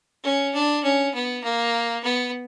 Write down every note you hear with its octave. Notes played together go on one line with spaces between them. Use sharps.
C#4
D4
C#4
B3
A#3
B3